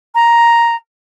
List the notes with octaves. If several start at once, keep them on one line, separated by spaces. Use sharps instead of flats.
A#5